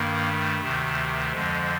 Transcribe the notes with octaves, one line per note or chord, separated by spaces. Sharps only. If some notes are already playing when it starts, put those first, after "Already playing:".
Already playing: G2 D#3 A#3
A3
D2 C3 D#3
F2 D3 F3 G#3